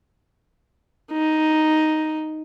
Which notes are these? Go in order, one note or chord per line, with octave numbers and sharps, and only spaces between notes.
D#4